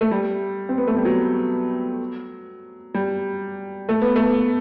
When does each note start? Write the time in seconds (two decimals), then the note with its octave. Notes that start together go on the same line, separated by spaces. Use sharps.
0.01 A3
0.11 G3
0.69 C4
0.78 B3
0.87 A3
0.97 G3
1.05 F#3
2.95 G3
3.89 A3
4.02 B3
4.16 A3